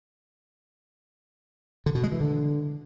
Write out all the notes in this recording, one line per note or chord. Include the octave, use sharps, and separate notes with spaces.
D3
B2
G#3
E3
D3